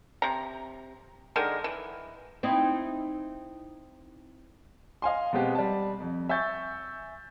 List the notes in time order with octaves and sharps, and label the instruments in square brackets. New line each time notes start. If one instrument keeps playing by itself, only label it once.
[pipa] C3 A#5
D3 D#3 G#3 A#4
E3
[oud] C4 D#4 E4
[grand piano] D#5 F5 G#5 C6
B2 G#3 B3 C4 G4
G3 A5
F2
E5 G#5 C#6 G6 A6